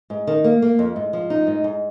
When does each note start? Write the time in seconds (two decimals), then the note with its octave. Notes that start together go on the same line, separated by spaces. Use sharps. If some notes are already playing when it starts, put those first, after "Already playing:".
0.10 G#2
0.27 D#3
0.44 A#3
0.62 A#3
0.79 F2
0.96 G#2
1.13 F3
1.30 D#4
1.47 G#2
1.64 G#2